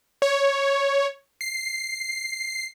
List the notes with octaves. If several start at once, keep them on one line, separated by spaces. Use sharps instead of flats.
C#5
C7